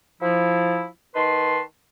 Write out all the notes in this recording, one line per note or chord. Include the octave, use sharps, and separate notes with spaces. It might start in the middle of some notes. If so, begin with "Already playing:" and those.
F3 E4
D#3 D#4 B4 A5 C6